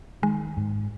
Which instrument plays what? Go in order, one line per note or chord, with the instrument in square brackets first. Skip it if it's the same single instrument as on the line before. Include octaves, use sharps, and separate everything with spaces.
[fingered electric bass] D#3 [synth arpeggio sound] G#3
[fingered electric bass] G#2